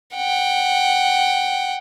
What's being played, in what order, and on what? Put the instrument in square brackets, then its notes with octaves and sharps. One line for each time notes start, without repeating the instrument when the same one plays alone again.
[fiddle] F#5 G5